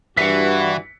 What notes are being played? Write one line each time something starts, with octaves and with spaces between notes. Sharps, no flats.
G2 E3 F#4 B6 C#7